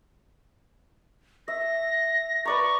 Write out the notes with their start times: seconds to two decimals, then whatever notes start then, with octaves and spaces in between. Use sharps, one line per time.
1.48 E5 A#6
2.45 B4 D5 A#5 C#6